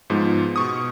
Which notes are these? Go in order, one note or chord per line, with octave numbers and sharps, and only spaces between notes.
G#2 F3 G#3 B3
B2 C#6 D#6